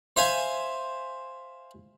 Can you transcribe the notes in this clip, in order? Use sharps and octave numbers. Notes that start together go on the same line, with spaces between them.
C5 E5 F5 G#5